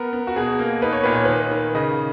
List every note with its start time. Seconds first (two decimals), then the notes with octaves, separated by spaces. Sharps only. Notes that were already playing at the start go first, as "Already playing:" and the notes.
Already playing: B3 A#4
0.13 B3
0.27 F#4
0.36 B2 G#4
0.59 A#3
0.82 D#4 B4
0.93 C#5
1.04 A#2 B4
1.15 C#5
1.25 D#3 B4
1.51 D#3
1.75 C#3 D#5